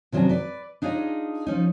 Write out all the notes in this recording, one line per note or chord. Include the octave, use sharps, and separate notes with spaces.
C3 D#3 F#3 G3 C#4 D4
B4 D5
D4 D#4 F4 G#4 C#5 D#5
F3 C#4 D#4